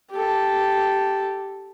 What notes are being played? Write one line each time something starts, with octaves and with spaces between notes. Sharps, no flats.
G4 A4